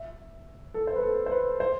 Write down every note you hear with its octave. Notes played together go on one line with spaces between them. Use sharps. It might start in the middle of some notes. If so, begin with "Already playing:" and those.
Already playing: E5
A4
C5
B4
A4
C5
B4
C5